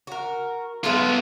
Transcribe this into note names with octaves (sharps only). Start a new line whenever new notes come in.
F#4 A#4
G#3 B3 F4 A4 E5